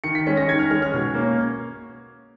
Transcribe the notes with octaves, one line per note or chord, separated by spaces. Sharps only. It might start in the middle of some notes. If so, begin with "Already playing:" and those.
D#3 C#7
B6
G#3 C#4 C#7
A#6
D#3 G#6
F6
G#3 C#4 F6
F6
B2
A#3 C#4